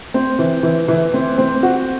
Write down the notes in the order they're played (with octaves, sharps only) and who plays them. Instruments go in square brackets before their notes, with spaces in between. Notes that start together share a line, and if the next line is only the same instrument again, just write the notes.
[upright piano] C4
E3
E3
E3
C4
C4
F#4